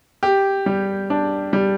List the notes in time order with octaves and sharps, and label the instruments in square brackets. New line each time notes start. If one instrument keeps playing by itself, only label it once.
[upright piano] G4
G3
D4
G3